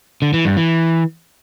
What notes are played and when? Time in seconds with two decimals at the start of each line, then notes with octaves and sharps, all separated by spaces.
0.22 D3
0.34 E3
0.45 G2
0.57 E3